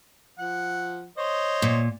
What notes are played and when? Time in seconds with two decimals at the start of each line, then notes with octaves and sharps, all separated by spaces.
0.39 F3 F#5
1.17 C5 C#5 D#5
1.62 A#2